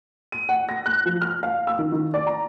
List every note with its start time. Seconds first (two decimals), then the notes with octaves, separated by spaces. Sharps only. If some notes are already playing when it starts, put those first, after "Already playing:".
0.32 D#7
0.49 F#5
0.69 A#6
0.86 F#6
1.06 F3
1.21 F6
1.43 F5
1.67 E6
1.79 D#3
1.92 D#3
2.14 D5
2.27 A#5